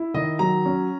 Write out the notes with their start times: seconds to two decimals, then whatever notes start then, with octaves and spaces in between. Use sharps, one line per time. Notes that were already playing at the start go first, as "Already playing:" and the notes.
Already playing: E4
0.14 D#3 D#5
0.39 F#3 A#5
0.65 C#4